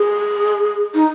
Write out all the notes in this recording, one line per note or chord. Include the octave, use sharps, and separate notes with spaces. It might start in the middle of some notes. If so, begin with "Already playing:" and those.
Already playing: G#4
D#4